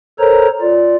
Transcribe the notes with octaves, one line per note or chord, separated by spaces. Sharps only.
A4 A#4 C5 C#5 A#5
F4 D5